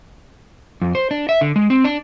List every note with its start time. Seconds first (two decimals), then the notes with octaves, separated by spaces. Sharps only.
0.82 F2
0.95 C5
1.11 D4
1.29 E5
1.41 D3
1.56 G#3
1.70 C4
1.84 D4